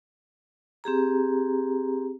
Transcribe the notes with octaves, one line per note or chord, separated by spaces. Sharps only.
C4 G4 G#4 A#5